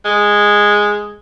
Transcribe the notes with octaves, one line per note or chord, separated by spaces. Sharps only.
G#3